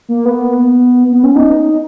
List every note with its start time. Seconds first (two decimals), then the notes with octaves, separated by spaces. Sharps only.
0.09 A#3
0.25 B3
1.12 B3
1.24 C#4
1.36 D#4